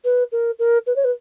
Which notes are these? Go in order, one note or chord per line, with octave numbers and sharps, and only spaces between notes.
B4
A#4
A#4
B4
C#5
B4